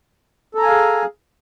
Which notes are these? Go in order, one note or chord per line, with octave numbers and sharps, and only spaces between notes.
G#4 A4 F5 G#5 A#5